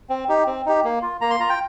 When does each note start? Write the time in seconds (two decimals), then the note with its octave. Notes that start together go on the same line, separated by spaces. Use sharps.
0.10 C4
0.29 D#4 G4
0.47 C4
0.66 D#4 G4
0.84 A#3
1.02 F4
1.21 A#3 A#5
1.30 C6
1.40 F4 A#5
1.50 G5